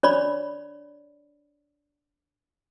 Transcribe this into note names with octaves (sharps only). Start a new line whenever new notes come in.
D4 C#5 D5 B5